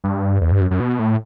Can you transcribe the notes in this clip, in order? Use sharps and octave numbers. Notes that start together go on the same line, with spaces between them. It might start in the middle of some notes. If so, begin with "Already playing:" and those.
G2
E2
G2
F#2
F#2
B2
A2